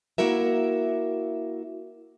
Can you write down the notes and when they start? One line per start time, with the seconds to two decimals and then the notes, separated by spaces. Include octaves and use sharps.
0.18 A#3 E4 F#4 A#4 E5